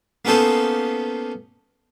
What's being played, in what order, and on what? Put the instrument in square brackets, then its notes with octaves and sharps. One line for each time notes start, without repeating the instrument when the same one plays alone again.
[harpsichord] A#3 B3 C#4 D#4 A4 C5